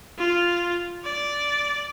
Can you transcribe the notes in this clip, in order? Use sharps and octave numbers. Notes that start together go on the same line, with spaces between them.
F4
D5